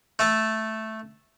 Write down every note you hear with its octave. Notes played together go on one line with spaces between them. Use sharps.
A3 A4